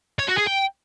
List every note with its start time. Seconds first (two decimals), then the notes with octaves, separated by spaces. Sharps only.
0.19 C#5
0.28 F#4
0.37 G#4
0.46 G5